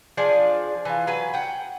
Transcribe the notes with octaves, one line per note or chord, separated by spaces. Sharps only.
F3 D4 G#4 D5
E3 F4
F#3 B4 G#5
F#5 G5